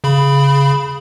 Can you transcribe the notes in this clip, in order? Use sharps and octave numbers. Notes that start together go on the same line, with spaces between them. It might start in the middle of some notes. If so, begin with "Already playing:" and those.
C#3 B5